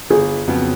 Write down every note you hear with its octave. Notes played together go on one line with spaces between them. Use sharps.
G1 G#4
F2 C#3 F#3 B3